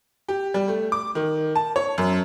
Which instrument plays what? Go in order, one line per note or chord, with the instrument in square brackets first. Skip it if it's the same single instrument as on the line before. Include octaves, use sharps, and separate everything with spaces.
[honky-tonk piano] G4
G3
A3
D6
D#3
A5
C#5
F#2